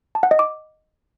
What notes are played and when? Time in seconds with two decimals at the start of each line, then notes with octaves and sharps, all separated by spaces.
0.15 A5
0.23 F#5
0.31 D#5
0.39 D6